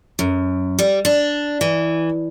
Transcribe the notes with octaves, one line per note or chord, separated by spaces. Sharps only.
F#2
G3
D4
E3